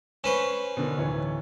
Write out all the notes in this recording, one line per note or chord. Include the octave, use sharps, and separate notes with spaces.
C#4 B4 C5 C#6 E7
B2 D3 D#3
D1 E3 C#5